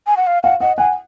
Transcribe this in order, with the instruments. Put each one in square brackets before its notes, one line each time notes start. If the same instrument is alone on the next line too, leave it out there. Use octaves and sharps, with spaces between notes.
[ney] G#5
F#5
F5
[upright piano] F5 [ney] F#5
[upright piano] D#5 [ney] F#5
[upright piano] F#5 [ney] G#5